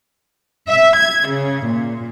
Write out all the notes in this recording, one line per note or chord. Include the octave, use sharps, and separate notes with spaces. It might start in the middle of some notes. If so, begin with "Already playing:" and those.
E5
G#6
C#3
A#2